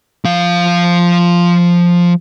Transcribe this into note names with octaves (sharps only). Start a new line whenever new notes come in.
F3 F5